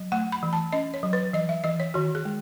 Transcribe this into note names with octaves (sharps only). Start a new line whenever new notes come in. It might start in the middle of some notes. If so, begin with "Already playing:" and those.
Already playing: F#3
A3 F#5
B5
E3
A5
C#4 D#5
C#5
F#3
B4
E3 D#5
E5
E3 D#5
C#5
D#3 F#4
G#4
G#3